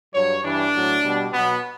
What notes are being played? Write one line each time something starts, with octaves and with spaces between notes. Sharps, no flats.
G2 F#3 C#5
G2 E3 G3 D4
A2 F#3
B2 G3
B2 F#3 B3